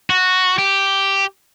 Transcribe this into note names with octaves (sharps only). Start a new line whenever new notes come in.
F#4
G4